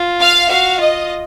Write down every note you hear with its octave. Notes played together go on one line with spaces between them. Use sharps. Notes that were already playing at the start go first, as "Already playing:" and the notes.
Already playing: F4
F5
F#4 F5
F4 D#5